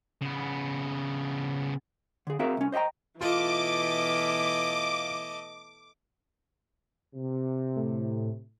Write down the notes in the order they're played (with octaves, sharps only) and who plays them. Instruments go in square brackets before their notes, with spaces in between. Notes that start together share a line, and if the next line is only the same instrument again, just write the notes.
[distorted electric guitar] C#3 B3
[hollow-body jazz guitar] D3 G#4
C4 F#4 G#4 A#4 E5 F5
C2 C#4
C5 D#5 E5 G5 A#5
[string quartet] B2 E3 [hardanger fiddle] A3 D#5 [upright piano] F4 [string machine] D6
[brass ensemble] C3
[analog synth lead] A2